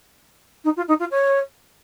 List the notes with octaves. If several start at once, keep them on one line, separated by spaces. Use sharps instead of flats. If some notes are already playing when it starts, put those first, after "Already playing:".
D#4
F4
D#4
F4
C#5